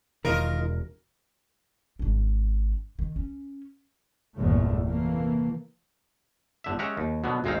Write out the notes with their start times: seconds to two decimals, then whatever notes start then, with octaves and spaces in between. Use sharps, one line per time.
0.25 E1 D#3 D#4 F4 A#4
1.99 G#1 D4
2.99 D#3
3.16 C#4
4.37 G1 E2 A#2 A3
4.85 C3 E3 A3 A#3
6.64 G1 D3 E5
6.79 G#3 C#4 G4 E5 F#5 A#5
6.97 D#2
7.24 B2 D3 F#3 B3
7.44 G#1 D2 G#3 C4 D#4 F5